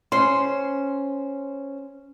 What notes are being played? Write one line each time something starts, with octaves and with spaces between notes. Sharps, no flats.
C#4 C5 C6